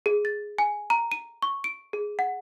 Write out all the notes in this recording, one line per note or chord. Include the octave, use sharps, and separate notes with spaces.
G#4
A6
G#5
A#5
D#7
C#6
D7
G#4
F#5